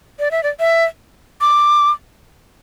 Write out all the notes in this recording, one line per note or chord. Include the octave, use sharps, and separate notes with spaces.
D5
E5
D5
E5
D6